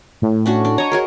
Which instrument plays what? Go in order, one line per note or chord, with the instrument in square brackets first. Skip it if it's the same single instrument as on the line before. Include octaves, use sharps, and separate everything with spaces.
[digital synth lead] A2
[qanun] C#4 D4 F#4
D4
[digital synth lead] C#5 [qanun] D#5 A#5
[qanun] F#4 G#4 A#4